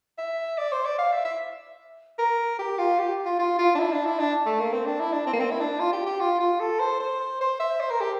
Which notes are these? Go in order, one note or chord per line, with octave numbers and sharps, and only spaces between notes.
E5
D5
C5
D5
F5
E5
E5
A#4
G4
F4
G4
F4
F4
F4
D4
E4
D4
E4
D4
A3
A#3
C4
D4
E4
D4
C4
A#3
C4
E4
D4
F4
G4
G4
F4
F4
A4
C5
C5
C5
E5
C5
A#4
G4